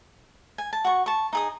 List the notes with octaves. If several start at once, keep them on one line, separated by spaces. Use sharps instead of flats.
G#5
A5
F#4 C#6
A5 C#6
D#4 G#4 D#6